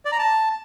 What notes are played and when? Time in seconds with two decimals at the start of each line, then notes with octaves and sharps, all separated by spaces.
0.05 D5
0.12 A#5
0.19 A5